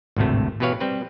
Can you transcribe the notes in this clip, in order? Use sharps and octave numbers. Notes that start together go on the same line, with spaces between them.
G#1 D2 A2 C3 A3
B2 E3 G4 B4 C#5 F5
G3 C4 B4